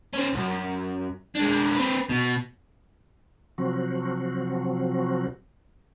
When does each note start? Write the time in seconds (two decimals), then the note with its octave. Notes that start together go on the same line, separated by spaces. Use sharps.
0.13 C#4 C5
0.33 C2 F#2
1.35 G#3 D4
1.76 C4 B4
2.09 B2
3.58 C3 F3 F#3 C4 F#4